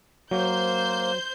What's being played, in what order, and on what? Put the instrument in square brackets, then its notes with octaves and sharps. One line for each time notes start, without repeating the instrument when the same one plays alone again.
[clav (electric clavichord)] F#3 [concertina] A#3 [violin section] C5 G6